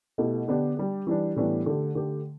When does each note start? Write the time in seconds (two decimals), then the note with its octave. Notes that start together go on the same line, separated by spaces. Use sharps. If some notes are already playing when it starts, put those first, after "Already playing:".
0.18 B2 A3 E4 G4
0.48 D3 B3 D4 G4
0.77 G3 D4 G4
1.07 E3 G3 D4
1.36 A2 E3 G3 B3 D4
1.66 D3 A3 G4
1.95 D3 A3 G4